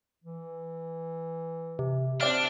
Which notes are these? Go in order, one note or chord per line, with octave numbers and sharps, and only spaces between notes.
E3
C3
C4 D4 D5 E5 F6